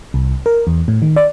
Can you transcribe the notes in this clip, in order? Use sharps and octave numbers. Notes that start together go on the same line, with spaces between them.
C2
A#4
E2
A2
D#3
D5